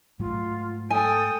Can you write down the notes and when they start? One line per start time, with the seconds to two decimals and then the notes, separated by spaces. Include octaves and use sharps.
0.19 G#2 F#3 A3 F4
0.90 A4 G5 G#5 D#6